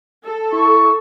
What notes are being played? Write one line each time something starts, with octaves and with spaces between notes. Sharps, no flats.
A4
E4 C#6